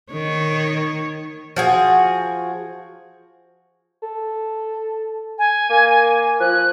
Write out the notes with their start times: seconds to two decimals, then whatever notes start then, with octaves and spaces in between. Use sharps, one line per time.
0.12 D#3 C#5
1.56 F3 F#4 G#4
4.02 A4
5.38 G#5
5.70 A#3
6.40 F3 F#6